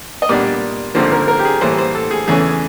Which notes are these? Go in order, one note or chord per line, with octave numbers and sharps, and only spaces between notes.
D#5
A#2 G3 B3 D4 D5
G#1 G2 D3 F3 A#3 C5
A#4
A#4
G4
G#4
A2 E3 G3 A#3 C5
C5
A4
G#4
E2 C#3 E3 A3 C#4 G#4